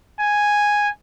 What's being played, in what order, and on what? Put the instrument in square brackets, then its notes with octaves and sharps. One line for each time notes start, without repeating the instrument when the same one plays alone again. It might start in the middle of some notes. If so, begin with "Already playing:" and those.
[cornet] G#5